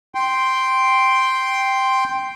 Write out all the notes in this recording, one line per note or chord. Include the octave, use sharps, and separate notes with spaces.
G5 C6